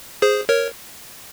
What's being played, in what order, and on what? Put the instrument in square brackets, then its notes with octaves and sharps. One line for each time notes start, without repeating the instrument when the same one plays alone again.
[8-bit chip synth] G#4 C5
A#4 C#5